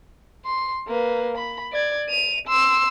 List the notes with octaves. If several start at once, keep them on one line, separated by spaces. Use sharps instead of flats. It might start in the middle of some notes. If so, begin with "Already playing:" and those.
C6
A#3 B4
B5
D5 G#6
D#7 F7
C6 E6